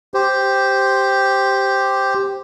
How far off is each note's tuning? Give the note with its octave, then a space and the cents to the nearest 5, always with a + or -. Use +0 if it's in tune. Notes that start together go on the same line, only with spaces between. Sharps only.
G4 +0 C5 +0